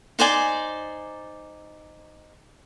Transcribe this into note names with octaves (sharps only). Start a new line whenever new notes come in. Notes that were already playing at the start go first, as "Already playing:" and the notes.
D#4 C5 D5 G#5